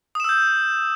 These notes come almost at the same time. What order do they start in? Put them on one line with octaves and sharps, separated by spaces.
D#6 E7 E6 G6